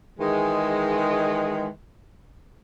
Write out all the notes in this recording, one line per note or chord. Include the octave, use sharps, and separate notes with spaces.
D#3 E3 G#3